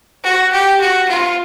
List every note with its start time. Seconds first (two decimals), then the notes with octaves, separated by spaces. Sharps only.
0.24 F#4
0.52 G4
0.80 F#4
1.08 F4